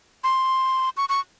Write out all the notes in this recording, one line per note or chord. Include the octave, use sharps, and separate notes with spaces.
C6
C#6
C#6